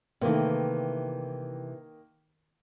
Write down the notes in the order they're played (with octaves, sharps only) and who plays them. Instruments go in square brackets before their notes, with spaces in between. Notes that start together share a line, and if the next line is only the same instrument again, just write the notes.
[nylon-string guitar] C3 E3 A3 [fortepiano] D#3 A#3